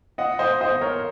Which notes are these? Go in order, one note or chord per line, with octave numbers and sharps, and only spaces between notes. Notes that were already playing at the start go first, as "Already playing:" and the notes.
D#5 F#5
C5 D#5
C5 D#5
A#4 C#5